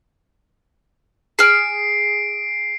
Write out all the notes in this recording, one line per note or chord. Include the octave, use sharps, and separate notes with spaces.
G#4 E6 F6 C7 D7